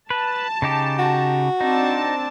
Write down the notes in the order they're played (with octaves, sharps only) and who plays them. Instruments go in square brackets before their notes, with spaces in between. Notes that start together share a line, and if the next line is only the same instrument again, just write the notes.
[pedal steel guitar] B4 [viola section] A5
[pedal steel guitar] C#3 D#4 G4
[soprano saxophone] F#4
[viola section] C4 D4 A5 [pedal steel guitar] D#4